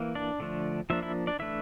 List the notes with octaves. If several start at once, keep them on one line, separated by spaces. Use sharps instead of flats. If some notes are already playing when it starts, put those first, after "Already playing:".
Already playing: E3 A#3
D4 D5
D3 F3 A3 D4
F3 A#3 D4 E4 E5
E4 E5
D4 D5
E3 A3 D4 E4 E5